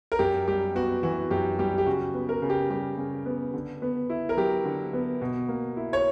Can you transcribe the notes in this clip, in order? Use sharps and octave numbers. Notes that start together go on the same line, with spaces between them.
A#4
F#2 G4
G3 G4
B3 F#4
E3 F#4
F#2 G4
G3 G4
G4
C#3 F#4
B3
A#4
C#3
G4
G3 G4
C#3
B3
D3
B3
E4
A#4
F#3 G4
D3
B3
B2
A#3
E4
C#5